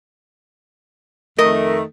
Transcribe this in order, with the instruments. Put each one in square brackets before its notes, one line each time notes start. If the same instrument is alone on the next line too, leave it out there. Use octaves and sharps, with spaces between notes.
[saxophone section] F2 D#3 A3 [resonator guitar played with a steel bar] A#4 D#5